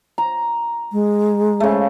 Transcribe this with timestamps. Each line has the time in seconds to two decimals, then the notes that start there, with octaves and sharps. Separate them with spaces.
0.18 A#5
0.92 G#3
1.60 C#3 A3